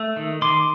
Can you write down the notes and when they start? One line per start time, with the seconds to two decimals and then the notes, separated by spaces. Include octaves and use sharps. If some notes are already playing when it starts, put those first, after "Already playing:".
Already playing: A3
0.17 D#3
0.42 D#3 C6 D6